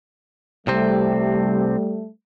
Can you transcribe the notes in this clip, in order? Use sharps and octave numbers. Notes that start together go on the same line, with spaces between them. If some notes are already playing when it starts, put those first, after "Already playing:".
C2 C3 G3 A3 C4